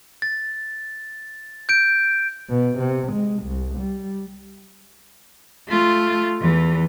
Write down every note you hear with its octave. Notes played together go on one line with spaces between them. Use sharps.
A6
G6 D7
B2
C3
G#3
C2
G3
A3 F4
E2 E3